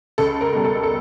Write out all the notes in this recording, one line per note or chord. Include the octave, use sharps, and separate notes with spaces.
C#2 A4
A#4
B2 G3
A4
A4